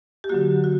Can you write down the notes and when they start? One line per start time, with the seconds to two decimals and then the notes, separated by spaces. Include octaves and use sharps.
0.24 G4
0.29 D3 F#3 A#3 F#4
0.64 F#4